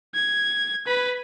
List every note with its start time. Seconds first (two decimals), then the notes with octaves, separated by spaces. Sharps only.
0.15 G#6
0.87 B4 B5